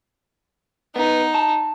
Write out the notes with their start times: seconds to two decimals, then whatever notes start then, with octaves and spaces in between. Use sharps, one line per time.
0.96 B3 D#4
1.35 A5